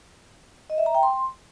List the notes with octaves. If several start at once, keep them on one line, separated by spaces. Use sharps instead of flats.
D#5
E5
A#5
G5
C6